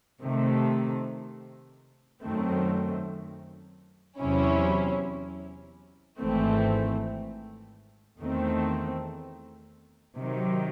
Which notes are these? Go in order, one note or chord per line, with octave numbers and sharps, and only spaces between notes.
C3 D#3 A3
F#2 D#3 A3 C4
E2 C3 F#3 C#4 E4
G#1 G#2 E3 A3 C4
E2 D#3 A3 C4
C3 D#3 F#3